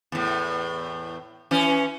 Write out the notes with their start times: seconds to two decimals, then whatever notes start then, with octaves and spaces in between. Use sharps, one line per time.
0.12 E2 A2
1.51 E3 C#4